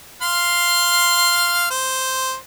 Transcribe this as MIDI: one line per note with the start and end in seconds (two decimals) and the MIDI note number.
0.22 1.66 77
0.22 1.66 84
1.71 2.35 72